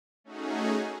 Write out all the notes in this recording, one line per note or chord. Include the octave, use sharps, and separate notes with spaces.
A3 C#4 D#4 F#4 G#4